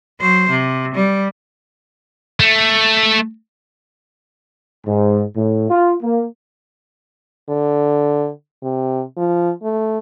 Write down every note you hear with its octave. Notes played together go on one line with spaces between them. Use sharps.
F#3 C5
C3
G3
A3
G#2
A2
F4
A#3
D3
C3
F3
A3